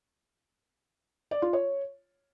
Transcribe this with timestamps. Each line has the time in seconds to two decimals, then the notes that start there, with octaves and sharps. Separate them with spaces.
1.31 D5
1.42 F4
1.53 C#5